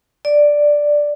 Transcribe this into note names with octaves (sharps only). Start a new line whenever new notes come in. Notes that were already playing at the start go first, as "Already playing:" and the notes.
D5